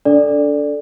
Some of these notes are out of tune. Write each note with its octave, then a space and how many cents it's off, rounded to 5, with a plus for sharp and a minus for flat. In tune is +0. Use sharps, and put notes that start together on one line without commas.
D4 -25 A4 +0 D5 +0